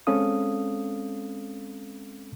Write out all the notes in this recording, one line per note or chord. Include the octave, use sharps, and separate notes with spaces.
G#3 C4 C#4 A4 F5 D#6